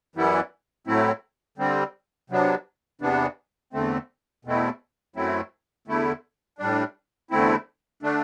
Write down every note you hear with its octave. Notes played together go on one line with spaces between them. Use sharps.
F#2 E3 G3 B3 E4
A2 F#3 A3 C4 E4
D3 G3 C4
C3 F#3 B3 D4
E2 C3 E3 B3 D4
E2 D3 A3 C4
E2 B2 A3 C4 E4
F#2 F#3 A3 C4 E4
E2 D3 A3 E4
A2 G3 D4
E2 D3 A3 C4 E4
D3 A3 D4